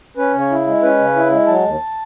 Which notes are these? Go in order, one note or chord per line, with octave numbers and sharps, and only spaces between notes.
C#4 B4
C#3
C#5
E4
G#3
C#4 B4
C#3
E4
G#3
F#3 A5
D#2